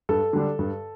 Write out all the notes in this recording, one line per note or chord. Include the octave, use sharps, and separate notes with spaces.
G2 A4
D3 G3 D4
G2